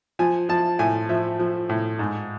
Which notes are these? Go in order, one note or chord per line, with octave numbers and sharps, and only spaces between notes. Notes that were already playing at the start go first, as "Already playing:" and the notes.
F3 G#5
F3 A5
A2 G#5
F3 E5
F3
A2
G#2